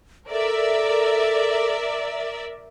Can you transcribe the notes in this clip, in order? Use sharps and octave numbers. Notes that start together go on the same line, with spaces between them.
A4 A#4 D5 E5